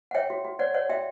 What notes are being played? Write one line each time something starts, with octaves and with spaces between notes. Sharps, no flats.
F#5
C#5 E5 G5
F#4
F#4
C#5 D5 F#5
C#5 D5 F#5
F#4 E5 G5